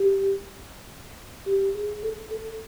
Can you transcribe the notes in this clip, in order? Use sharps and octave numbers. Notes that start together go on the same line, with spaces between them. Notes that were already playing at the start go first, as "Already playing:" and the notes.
Already playing: G4
G4
G#4
A4
A4